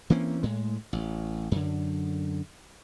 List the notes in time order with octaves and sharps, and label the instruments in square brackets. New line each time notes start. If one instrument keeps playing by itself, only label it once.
[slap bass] E3 A#3 C4 C#4
A2 G#3
A1
F#2 D3